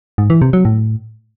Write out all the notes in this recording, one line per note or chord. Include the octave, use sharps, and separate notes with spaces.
G#2
E3
C3
F#3
A2